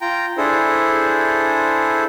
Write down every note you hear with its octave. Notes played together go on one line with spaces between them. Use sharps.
F4 G5 A#5
D4 E4 G#4 A4 C5